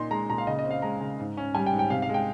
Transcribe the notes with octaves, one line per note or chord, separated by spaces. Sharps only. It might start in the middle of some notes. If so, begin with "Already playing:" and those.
Already playing: A#2 D#4 C6
G#3 A#5
A#2 A#5
F5
C#3 D#5
D#5
C4
F5
G#3 A#5
C#3
G#2
C#4
G3 G#5
G5
G#2
G5
C3 F5
F5
G#3
G5